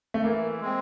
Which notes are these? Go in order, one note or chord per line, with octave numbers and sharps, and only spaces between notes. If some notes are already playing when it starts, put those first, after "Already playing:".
A3
E3 A#3
G#3 C4